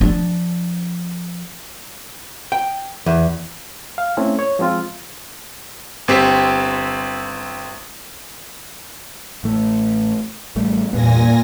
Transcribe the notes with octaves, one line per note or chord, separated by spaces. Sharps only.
F3 D4
G5
E2
F5
A3 C4 C#4 E4
C#5
F3 G#3 C4 F4
G1 C4 G4 B6
A1 A3
A1 G3 A3
E2 G2 A#2 B3 G#5 A#6